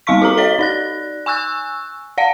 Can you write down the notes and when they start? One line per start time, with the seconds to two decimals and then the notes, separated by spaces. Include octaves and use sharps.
0.07 G3 C4 F5 C6 C#6 B6
0.22 F#4 G4 A4 A#5
0.37 C#5 D#5 B6 G7
0.59 D#4 D5 F#6
1.26 G#5 C#6 E6 F#6
2.18 D5 F5 F#5